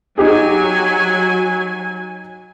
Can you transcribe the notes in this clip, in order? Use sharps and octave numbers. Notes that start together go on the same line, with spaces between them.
F#3 D#4 G4 G#4 G#5